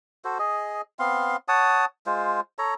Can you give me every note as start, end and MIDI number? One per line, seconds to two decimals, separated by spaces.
0.25 0.38 66
0.25 0.38 69
0.25 0.38 72
0.39 0.81 68
0.39 0.81 75
0.99 1.36 59
0.99 1.36 60
0.99 1.36 77
0.99 1.36 84
1.48 1.85 73
1.48 1.85 78
1.48 1.85 81
1.48 1.85 87
2.06 2.41 56
2.06 2.41 65
2.06 2.41 72
2.59 2.74 69
2.59 2.74 73
2.59 2.74 82